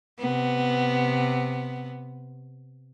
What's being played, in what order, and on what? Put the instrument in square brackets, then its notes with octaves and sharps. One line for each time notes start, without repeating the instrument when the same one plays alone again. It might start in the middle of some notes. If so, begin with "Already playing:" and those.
[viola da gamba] C3 B3